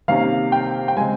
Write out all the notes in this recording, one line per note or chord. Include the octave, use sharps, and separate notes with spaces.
C3 D#3 A#3 C#4 F5
G5
G5
C#3 G#3 C4 G#5